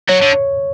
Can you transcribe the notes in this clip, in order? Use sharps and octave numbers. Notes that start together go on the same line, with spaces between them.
F#3 C#5
D3